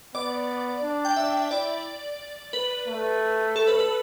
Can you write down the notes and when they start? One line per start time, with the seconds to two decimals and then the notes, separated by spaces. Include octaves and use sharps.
0.15 B3 D5
0.82 D4
1.05 G5
1.16 D4 E5
1.51 E4 D5
2.53 B4
2.88 A3
3.56 A4
3.67 B4
3.79 B4